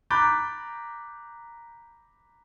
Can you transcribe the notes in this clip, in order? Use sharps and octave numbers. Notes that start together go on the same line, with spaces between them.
A#5 B5 D6 F#6 G6 A6